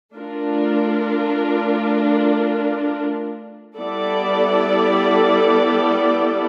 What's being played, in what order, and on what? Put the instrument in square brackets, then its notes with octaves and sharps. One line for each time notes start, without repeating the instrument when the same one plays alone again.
[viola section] A3 D4 F4 A#4
G3 B3 E4 A4 D5